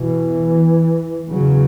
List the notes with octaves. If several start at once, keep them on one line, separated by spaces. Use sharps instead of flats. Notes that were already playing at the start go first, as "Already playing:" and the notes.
Already playing: E2 B2 E3
E2 C#3 F#3